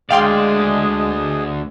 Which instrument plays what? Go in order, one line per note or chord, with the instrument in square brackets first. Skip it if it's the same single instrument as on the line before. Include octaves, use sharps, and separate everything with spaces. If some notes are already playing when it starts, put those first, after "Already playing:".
[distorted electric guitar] D2 D5 [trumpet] G#3 [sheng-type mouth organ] G#4 D#5 [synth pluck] F5 G5 C6